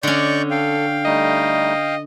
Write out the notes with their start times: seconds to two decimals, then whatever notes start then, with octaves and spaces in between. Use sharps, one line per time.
0.03 D3 C#4 D5 D#5 C#6 G6
0.51 A4 F5 G5
1.05 G3 A3 D#4 D#5